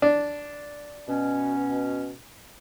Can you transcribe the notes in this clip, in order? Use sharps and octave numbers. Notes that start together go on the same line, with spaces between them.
D4
B2 C#4